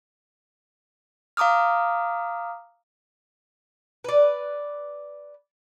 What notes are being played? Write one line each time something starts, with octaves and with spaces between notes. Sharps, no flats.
F5 A#5 D6 D#6 F6
B4 D5